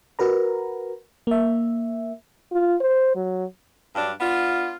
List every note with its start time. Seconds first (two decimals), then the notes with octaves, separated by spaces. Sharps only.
0.19 F#4 A#4 B4 A#5
1.27 A#3 E5
2.52 F4
2.80 C5
3.16 F#3
3.95 G2 F#3 D4
4.20 B3 D4 F4